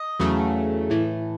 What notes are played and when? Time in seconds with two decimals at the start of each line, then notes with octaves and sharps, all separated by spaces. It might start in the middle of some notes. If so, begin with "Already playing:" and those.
Already playing: D#5
0.20 E2 C#3 F#3 A3
0.90 A2 E3 A3